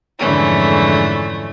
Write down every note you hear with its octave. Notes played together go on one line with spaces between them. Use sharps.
F2 G#2 D3 E3 A3 C#4